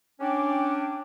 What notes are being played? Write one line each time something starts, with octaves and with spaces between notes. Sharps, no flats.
C#4 D4 G5 D6